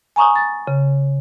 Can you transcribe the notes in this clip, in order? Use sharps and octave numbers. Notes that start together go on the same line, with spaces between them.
G#5 A#5 C#6 D#6
A6
C#3